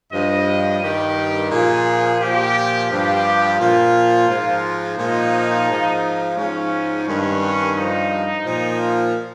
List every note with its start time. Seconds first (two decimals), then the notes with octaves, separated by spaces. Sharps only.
0.12 G2 F3 D#5
0.81 G2 D#3 G4
1.51 A#2 F3 G#4
2.20 A#2 F3 G4
2.90 G2 F3 G4
3.60 A#2 F3 F4
4.28 G#2 F3
4.98 A#2 F3 D#4
5.68 G#2 F3
6.37 G#2 F3 C#4
7.07 G2 D#3 C#4
7.76 G2 F3 D#4
8.45 A#2 F3